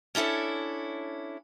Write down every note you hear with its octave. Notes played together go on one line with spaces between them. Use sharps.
C#4 D4 E4 A4 C#5